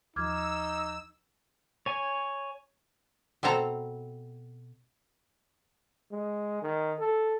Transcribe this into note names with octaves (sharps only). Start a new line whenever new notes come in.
D#2 F3 D#4 D6 E6 F6 G#6
C#5 G#5
B2 C4 A4 A#5
G#3
D#3
A4